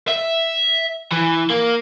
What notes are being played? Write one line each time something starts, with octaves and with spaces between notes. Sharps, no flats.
E5
E3
A#3